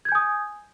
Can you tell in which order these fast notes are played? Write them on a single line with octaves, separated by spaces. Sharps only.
G#6 G6 G#5 D#6